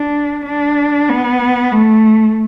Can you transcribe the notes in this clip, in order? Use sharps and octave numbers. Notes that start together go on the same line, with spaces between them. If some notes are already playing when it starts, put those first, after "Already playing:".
Already playing: D4
D4
B3
A3